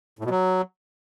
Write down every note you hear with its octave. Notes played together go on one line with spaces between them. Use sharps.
A2
B2
F#3